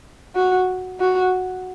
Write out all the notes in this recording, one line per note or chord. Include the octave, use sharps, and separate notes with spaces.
F#4
F#4